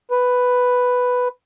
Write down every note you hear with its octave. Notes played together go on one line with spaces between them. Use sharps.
B4